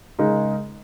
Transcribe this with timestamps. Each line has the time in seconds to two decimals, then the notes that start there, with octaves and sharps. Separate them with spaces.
0.19 C#3 G#3 D#4 A#4